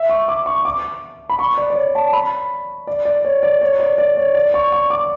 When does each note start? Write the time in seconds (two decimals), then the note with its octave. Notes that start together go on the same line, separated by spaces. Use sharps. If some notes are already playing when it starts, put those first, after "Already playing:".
Already playing: E5
0.09 C#6
0.28 D6
0.46 C#6
0.65 D6
1.29 B5
1.39 C#6
1.58 D5
1.70 D5
1.75 C#5
1.95 A5
2.13 B5
2.87 D5
3.05 D5
3.25 C#5
3.43 D5
3.61 C#5
3.80 D5
3.98 D5
4.17 C#5
4.35 D5
4.54 C#6
4.72 C#6
4.90 D6